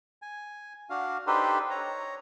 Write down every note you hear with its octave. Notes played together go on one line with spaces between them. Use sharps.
G#5
D4 F#4 F5
D4 D#4 G4 A4 B4 C5
C#5 A#5